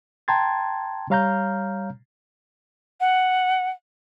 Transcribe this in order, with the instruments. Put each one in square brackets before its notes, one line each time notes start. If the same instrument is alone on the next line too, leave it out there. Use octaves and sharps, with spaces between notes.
[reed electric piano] G5 A5 A#5 C6 G#6 A6
G3 C#5 F5 A#5 F6 G6
[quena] F#5